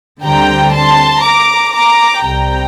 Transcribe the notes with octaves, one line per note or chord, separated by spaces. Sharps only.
D2 D3 G3 C4 G5 A#5
A5 C6
A#5 D6
A#5 D6
C2 C3 G3 G5 A#5